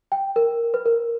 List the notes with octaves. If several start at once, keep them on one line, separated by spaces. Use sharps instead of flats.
G5
A#4
B4
A#4